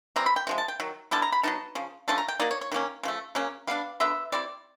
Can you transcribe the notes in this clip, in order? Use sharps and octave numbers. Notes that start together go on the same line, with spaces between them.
E3 G3 C4 A#5
B5
G5
C3 F3 G#3
A5
G5
D#3 F#3
D3 G3 B3 E4 A5
A#5
B5
F#3 B3 D#4 A5
C#3 F3
D3 F3 A3 C#4 A5
A#5
G5
F#3 A#3 D#4 D5
C#5
C#5
D#3 F#3 A#3 C#4
C#3 F3 A3
C#3 F#3 A#3 C#4
G3 B3 D4 F5
D3 F#3 B3 E5
G3 C4 E4 D5